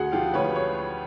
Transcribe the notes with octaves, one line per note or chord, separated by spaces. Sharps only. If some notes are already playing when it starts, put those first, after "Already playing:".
Already playing: D2 F#4 G#4
F3 F4 G4
D2 B4 C#5
C#5